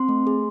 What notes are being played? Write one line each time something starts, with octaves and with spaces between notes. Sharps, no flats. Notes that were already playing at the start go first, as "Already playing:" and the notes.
Already playing: C4 C6
A3
G#4